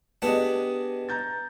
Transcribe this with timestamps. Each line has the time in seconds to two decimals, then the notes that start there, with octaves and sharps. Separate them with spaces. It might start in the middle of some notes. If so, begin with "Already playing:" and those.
0.22 B3 D4 G4 G#4 D#5
1.09 A#5 G6 A6